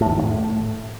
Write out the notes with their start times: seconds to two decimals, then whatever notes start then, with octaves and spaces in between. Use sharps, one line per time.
0.01 A2
0.06 E2
0.12 D#3
0.17 F#2
0.22 A2